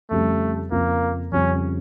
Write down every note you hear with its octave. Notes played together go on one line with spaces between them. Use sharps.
F2 C#3 G3 A3
F2 C#3 F3 A#3
F2 C#3 G3 C#4